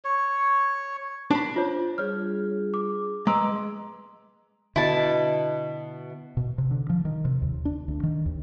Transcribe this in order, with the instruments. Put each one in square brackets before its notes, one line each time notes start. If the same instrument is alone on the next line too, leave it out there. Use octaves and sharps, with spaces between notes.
[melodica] C#5
[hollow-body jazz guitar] D4 B5
[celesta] F4 C5 C#5
[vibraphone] G3 F4 G#4 [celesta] C#5 F6
[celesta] D6
[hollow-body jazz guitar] G#3 [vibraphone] B4 D#5 D6 [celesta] A#5 C6 E6
[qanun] B2 [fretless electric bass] D3 [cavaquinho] E4 A5
[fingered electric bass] B2
C3
D3
F3
D#3
C3
D#2
D4
D2
D#3
D#2